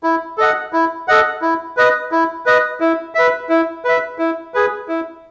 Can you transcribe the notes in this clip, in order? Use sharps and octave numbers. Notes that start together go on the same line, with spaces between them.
E4
A4 D#5 F#5
E4
A4 D#5 F#5
E4
B4 D#5
E4
B4 D#5
E4
B4 E5
E4
B4 E5
E4
G#4 B4
E4